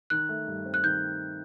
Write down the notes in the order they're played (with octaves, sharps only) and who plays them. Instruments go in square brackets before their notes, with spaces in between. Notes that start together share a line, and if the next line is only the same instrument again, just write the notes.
[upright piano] D#3 [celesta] F#6
[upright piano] A3
G2
C4
[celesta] F#6
[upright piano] D#3 [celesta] G6